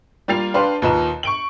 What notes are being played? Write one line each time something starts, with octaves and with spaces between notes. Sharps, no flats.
G3 A#3 F4 A6 C7 F7
D4 G4 B4 F5 C6
D#2 A#2 B4 D#5 A#5 E7
C#6 D7 F#7